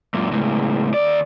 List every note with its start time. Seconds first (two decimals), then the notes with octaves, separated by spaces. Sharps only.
0.14 F#2 A#2
0.32 C#2 A2
0.94 D#2 D5